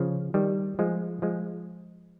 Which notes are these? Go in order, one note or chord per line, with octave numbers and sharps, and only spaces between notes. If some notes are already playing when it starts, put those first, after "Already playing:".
Already playing: C#3 F3
D#3 G3
F3 G#3
F3 G#3